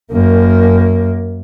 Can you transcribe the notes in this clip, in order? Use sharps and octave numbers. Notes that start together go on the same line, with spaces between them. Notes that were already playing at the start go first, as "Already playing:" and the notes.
F#2 A#3